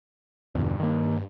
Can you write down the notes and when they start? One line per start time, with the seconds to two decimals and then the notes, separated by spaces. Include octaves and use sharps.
0.55 E2 G2 B2 D3
0.80 D#3 A#3